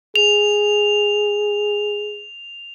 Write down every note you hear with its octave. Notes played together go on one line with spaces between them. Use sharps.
G#4 F7